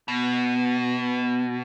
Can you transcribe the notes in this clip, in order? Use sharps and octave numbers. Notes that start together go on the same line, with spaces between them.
B2 B3